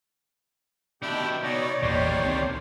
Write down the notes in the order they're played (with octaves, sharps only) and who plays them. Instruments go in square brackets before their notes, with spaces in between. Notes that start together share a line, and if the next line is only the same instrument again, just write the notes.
[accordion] B2 D#3 [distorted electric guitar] D4 E4 [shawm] G4
[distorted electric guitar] B2 [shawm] D#4 [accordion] C#5 D5
[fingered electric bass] G#1 E2 A#2 [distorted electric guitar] D#3 G3 [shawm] C5
[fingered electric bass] C#2 C4